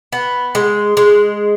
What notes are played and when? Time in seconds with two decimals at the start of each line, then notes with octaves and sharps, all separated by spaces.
0.13 B3
0.55 G#3
0.97 G#3